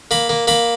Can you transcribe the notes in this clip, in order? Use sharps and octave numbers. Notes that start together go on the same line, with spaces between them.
A#3 B5
A#3
A#3 B5